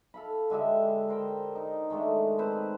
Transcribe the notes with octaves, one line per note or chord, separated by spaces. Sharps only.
A4 F5 B5
D3 G#3 G4 E5
A#4 C5 G5
D#4
D#3 G#3 A3 D4
C4 D#4 B4 C5